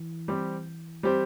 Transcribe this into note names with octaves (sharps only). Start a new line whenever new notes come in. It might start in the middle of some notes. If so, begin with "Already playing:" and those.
Already playing: E3
G3 C4 G4 C5
G3 C4 G4 C5